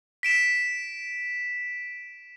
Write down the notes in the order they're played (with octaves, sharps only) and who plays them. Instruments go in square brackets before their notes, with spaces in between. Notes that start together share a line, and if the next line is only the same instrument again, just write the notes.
[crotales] B6 D7 E7